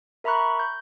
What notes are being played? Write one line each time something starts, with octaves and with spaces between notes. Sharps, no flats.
A#4 E5 A#5 B5 C#6 F#6
G6